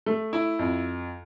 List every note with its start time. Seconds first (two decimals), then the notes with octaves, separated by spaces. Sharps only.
0.06 A3
0.33 E4
0.59 F2